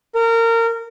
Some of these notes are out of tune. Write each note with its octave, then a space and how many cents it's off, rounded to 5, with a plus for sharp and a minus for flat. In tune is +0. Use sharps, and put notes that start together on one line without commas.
A#4 -25